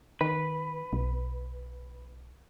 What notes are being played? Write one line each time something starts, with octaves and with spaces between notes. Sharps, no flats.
D#3 B4
B1